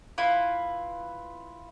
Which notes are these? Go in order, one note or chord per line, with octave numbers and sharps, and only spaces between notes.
E4 F4 B4